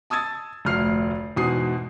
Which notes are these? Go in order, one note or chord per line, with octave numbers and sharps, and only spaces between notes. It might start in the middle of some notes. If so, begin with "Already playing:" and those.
A5 D#6 E6 G#6 A6
F1 D2 F6 C7
E2 G#2 B2 D#6 C7